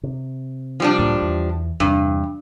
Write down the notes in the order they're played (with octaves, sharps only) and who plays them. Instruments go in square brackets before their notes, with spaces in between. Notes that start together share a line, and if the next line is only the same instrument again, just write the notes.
[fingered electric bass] C3
[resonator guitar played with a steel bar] F3 G3 D4
[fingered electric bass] C#2 A2 A#3
E2
[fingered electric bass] E2 C3 [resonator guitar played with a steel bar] G2